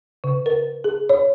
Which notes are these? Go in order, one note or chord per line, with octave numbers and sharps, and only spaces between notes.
C#3
A#4
G#4
C#5